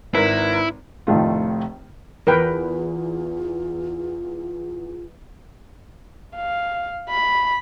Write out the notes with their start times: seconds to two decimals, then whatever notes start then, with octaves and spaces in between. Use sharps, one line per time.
0.15 G#1 E4 A#4 B4
1.07 F1 A2 D#3 A3 F4
2.27 E2 F4 A#4 B4 G5
6.36 F5
7.10 B5